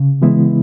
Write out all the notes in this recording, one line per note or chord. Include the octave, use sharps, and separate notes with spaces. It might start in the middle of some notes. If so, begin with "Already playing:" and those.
Already playing: C#3
E3 G#3 B3 E4